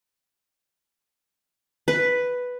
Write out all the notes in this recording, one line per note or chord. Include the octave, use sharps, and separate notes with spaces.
B4